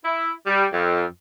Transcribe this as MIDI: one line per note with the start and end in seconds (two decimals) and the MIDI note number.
0.04 0.31 64
0.47 0.65 55
0.73 1.04 41